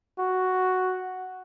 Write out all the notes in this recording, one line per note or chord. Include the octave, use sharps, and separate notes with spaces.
F#4